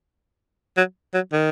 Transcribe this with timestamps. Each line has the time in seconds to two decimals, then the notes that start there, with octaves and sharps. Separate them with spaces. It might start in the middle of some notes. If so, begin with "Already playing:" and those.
0.77 F#3
1.14 F#3
1.32 D#3